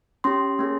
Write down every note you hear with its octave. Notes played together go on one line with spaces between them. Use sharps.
C#4 G4 C6
A#3 C#4 G#4